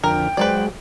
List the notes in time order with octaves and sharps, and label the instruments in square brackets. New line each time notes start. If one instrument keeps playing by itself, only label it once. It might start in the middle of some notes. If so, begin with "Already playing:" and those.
[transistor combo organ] F2 D3 [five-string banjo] A#4 [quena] G5
[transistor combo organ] F#3 G#3 [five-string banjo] B4 C5 D5